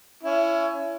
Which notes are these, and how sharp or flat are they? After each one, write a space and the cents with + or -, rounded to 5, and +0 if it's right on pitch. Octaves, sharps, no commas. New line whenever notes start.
C#4 +20 E4 +25